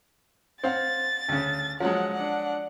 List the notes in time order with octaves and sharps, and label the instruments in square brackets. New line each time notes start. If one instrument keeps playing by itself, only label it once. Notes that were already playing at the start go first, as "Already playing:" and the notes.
[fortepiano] C4 F5 F#5 [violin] A6
[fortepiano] D2 C#3
[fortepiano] F3 F#3 G#3 [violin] F#5
[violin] D4 F#5